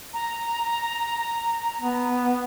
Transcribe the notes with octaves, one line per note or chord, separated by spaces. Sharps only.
A#5
B3